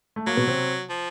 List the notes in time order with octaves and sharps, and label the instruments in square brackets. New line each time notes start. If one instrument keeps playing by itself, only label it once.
[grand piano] A3
[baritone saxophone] F#3 [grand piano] A#3
[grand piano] B2 B3
C3 C4
[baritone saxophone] F3